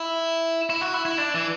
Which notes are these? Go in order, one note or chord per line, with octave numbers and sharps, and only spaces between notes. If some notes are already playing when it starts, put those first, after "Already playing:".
Already playing: E4
E4
F#4
E4
E4
D4
E3